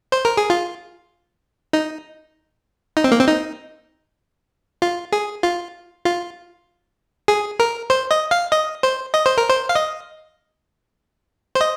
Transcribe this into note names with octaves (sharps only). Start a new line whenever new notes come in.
C5
A#4
G#4
F4
D#4
D#4
C4
A#3
C4
D#4
F4
G#4
F4
F4
G#4
A#4
C5
D#5
F5
D#5
C5
D#5
C5
A#4
C5
F5
D#5
C5
D#5